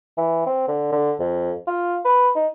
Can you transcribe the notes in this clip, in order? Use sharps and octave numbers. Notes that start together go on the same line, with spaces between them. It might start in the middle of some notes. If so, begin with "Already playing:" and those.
E3
C4
D3
D3
F2
F4
B4
D#4